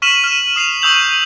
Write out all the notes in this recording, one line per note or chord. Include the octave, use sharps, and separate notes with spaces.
C#6 F6 B6 D#7 E7 F#7
F6 E7
D#6 C7 E7 F7
C#6 D#6 E6 G6 F7 F#7